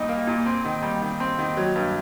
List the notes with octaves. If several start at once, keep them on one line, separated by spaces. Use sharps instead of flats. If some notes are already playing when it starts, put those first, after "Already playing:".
Already playing: A#2 G3 D#4
A#3
A#2
C4
D#3
G3
D#3
C4
D#3
F#3
G2